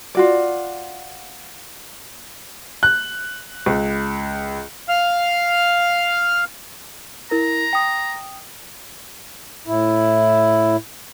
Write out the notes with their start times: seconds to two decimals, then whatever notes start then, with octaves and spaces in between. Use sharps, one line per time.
0.15 F4 F#4 D5
2.83 F#6
3.66 C#2
4.89 F5 F6
7.31 E4 A#4 A#5
7.73 G5 D#6
9.67 A2 E4